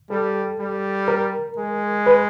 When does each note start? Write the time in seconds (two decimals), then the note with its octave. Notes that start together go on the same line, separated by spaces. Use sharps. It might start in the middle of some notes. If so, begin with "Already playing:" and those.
0.10 G3 A4
0.59 G3
1.08 A#4
1.58 G#3
2.06 B4